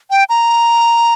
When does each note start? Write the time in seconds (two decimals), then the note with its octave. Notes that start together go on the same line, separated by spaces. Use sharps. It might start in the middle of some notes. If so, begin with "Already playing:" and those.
0.11 G5
0.29 A#5